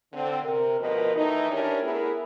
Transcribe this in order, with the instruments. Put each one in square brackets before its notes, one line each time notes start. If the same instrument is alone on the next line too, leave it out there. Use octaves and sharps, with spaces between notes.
[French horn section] D3 C4
C3 A#4
D2 B2 F3 A#4 B4 D#5
D#3 E3 A3 D#4
C#4 D4 E4 G4 A#4 C#5
A3 B3 E4 G#4 A#4 B4